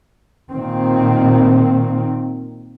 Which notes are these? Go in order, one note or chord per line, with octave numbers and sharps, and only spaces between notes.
A#2 D#3 C4